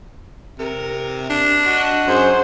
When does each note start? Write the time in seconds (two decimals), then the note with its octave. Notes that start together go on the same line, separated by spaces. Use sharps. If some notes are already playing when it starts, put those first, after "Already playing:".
0.58 C3 A#4
1.30 D4
1.64 F#4 D#5
2.07 F#2 G#4 C5